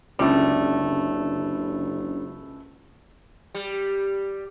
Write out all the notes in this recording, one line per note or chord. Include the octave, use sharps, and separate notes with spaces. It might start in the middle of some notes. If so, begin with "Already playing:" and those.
F#1 C#2 D3 G3 A3 C4 D4
G3